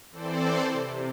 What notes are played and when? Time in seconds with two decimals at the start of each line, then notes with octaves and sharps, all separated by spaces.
0.11 E3 C4 A4 C5 D5
0.71 C3